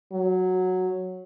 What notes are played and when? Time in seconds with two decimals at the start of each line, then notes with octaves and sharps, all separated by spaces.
0.12 F#3